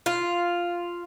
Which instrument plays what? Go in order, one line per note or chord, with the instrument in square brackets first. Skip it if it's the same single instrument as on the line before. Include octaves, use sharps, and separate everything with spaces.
[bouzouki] F4